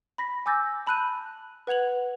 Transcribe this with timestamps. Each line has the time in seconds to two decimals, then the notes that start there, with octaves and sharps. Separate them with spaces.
0.18 B5 A#6 B6
0.46 G#5 D6 E6 G6 A6 A#6
0.87 A5 B5 E6 F#6 G6 D#7
1.67 B4 F#5 G#6 F7 F#7